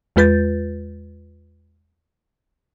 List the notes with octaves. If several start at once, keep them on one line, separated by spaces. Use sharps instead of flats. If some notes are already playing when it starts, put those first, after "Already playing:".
E2 G#3 F4 B4 G6 A6